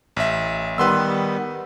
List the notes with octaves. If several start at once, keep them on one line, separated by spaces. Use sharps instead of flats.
A1 E5
D#3 G3 B3 B4 C6 E6